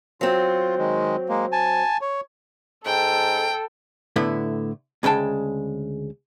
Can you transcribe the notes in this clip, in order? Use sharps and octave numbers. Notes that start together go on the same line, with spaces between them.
F#3 C4 F4
D#3 G#3
G#3 A#3
G#5 A5
C#5
G#2 A4 G5
A2 D3 A3 B3 E4
D2 C#3 G#3 G5 A5